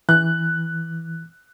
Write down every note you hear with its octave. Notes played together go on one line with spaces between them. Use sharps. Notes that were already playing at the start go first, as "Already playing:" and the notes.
E3 F#6